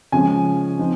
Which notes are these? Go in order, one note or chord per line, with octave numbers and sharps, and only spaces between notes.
C#3 F3 G#3 C#4 G#5
F3 C4 D#4